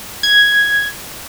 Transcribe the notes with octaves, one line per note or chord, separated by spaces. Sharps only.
G#6